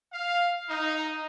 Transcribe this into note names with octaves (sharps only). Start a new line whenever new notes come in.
F5
D#4